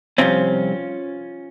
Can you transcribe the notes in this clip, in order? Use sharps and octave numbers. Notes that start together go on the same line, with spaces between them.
C2 C3 F3 C4 C#4 F4